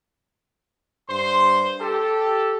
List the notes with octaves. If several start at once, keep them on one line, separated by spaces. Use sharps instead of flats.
G2 C5 C6
G4 A4